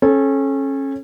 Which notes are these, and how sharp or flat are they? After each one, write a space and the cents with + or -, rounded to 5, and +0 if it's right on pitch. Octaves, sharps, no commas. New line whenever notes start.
C#4 -25 A4 -30